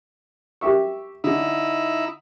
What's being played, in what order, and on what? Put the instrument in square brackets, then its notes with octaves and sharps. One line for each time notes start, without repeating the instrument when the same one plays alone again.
[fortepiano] G4 E5 C#6
[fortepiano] D3 [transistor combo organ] D#4 E4 E5